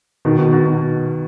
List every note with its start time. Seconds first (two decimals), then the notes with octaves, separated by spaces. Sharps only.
0.25 B2 D#3
0.38 B2 D#3
0.53 B2
0.66 B2